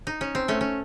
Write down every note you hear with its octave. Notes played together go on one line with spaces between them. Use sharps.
D#4
C#4
C4
A3 C#4
C#4